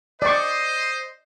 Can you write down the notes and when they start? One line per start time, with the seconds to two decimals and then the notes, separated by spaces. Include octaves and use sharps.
0.22 C5 D5 D#5 C#6